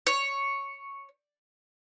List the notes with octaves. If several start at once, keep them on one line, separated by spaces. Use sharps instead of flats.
C#5